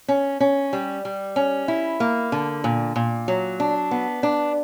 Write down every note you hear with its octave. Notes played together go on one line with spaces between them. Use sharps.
C#4
C#4
G3
G3
C#4
E4
A#3
D3
A#2
A#2
F#3
D4
B3
D4